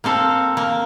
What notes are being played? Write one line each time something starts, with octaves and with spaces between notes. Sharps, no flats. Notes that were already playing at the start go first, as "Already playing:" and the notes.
A#3 C4 A4 F5
A#3